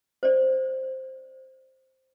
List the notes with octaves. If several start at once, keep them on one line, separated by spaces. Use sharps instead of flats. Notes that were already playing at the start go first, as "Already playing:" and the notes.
C5 D5